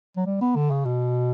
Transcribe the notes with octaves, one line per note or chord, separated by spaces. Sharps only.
F#3
G3
B3
D3
C#3
B2